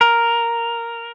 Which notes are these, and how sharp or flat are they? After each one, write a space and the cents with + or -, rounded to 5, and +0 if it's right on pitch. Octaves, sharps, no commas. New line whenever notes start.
A#4 +0